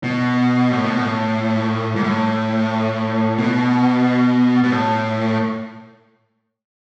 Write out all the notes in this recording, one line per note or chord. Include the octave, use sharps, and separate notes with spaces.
B2
A2
B2
A2
G#2
A2
B2
B2
A2